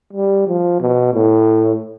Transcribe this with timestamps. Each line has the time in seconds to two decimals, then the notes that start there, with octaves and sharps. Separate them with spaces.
0.13 G3
0.47 F3
0.80 B2
1.13 A2